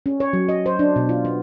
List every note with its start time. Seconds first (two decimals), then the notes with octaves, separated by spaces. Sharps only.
0.06 C#4
0.20 C#5
0.33 F#3
0.49 D#5
0.66 C5
0.79 D4
0.96 B2
1.09 F4
1.25 B3